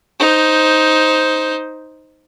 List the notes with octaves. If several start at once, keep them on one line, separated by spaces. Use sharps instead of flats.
D#4 C5